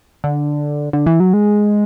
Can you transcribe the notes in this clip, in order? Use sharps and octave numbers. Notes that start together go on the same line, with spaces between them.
D3
D3
E3
F#3
G#3